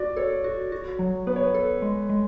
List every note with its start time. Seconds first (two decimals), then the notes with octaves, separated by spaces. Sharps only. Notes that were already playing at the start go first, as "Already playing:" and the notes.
Already playing: F#4 D5
0.16 A4 C#5
0.44 F#4
0.72 F#4
0.99 F#3
1.27 B3 B4
1.36 C#5
1.43 B4
1.54 A4
1.82 G#3
2.09 G#3